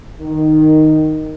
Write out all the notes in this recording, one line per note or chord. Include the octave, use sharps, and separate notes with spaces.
D#3